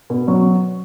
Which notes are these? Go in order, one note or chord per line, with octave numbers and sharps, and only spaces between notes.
B2
F#3